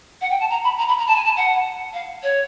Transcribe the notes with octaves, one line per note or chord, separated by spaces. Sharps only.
F#5
G5
A5
A#5
B5
A#5
B5
A#5
A5
G#5
A5
F#5
F5
C#5